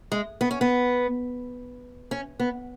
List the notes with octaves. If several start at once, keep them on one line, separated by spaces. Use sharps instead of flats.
G#3
B3
C#4
B3
C#4
B3